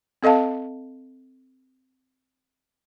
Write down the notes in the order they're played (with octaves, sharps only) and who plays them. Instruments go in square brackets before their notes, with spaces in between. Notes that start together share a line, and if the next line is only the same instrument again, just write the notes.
[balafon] C4 A4 D#5 F5 A5